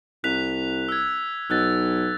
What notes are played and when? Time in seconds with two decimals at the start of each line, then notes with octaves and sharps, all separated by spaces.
0.24 C2 F#6 B6 F7
0.89 E6 G#6
1.50 B1 E6 F#6 A6